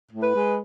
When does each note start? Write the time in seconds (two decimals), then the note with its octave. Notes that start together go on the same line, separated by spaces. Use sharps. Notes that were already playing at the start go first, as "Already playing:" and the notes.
0.12 A2
0.23 B4
0.35 G#3